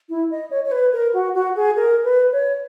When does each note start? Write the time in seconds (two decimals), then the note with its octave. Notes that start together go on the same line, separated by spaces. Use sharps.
0.09 E4
0.31 D#5
0.51 C#5
0.64 C#5
0.72 B4
0.93 A#4
1.14 F#4
1.35 F#4
1.56 G#4
1.76 A#4
2.04 B4
2.32 C#5